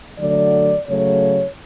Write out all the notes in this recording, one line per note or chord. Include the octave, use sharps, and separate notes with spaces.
D3 F#3 A3 D5
C#3 F#3 A3 C#5